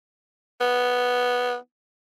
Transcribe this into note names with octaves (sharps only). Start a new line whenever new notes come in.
B3